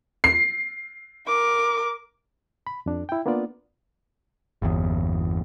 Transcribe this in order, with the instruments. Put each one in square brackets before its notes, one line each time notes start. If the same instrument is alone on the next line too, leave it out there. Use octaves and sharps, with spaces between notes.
[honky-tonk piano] C7
[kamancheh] A#4 D6
[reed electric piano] B5
F2 D4
E4 G5
A#3 B3 D4 F4 D5
[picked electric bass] G1 E2